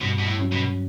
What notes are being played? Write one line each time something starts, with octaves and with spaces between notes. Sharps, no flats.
G2 B2
B2
A2
F#3 C#4
B2